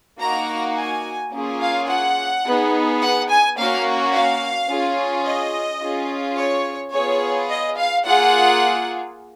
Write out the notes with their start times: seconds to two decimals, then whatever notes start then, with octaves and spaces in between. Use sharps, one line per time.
0.20 A#3 D#4 F#4 A#5
0.77 G#5
1.33 A#3 C#4 F4 G#4
1.61 F5
1.89 F#5
2.45 B3 D#4 G#4
3.01 F#5
3.29 G#5
3.57 A#3 C#4 F#4 F5
4.13 F5
4.69 C#4 F4 G#4
5.26 D#5
5.82 C#4 F4 G#4
6.38 C#5
6.93 B3 F4 G#4 C#5
7.50 D#5
7.78 F5
8.06 A#3 F4 G#4 F#5